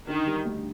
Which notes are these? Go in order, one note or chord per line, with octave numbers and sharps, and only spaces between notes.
D3 D#3
G3
D2